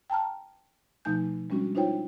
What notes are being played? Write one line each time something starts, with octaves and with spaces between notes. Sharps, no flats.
G5 A5 A#5 F6
B2 F3 A3 D#4 G#5 G6
G3 G#3 C#4 D4 F#4
D4 D#4 F4 C5 C#5 G5